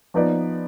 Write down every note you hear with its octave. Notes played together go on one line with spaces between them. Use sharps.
F3 B3 D#4 B4 D5